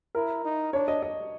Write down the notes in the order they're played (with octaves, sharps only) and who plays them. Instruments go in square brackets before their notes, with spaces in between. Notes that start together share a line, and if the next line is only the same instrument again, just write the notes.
[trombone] E4 [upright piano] A#4
[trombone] D#4
[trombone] D4 [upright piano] C#5
[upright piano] D#5
D#5